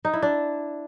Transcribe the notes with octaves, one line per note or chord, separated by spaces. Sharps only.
D#4
E4
D4